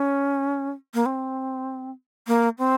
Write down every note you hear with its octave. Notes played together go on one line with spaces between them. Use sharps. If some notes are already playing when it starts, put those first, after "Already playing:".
Already playing: C#4
A#3
C4
A#3
C4